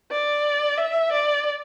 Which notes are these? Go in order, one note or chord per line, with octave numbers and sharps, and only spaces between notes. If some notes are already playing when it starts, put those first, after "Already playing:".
D5
E5
D5